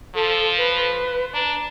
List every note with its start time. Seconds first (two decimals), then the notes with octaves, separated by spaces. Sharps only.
0.15 F3 A4
0.58 B4
1.34 D4 A#5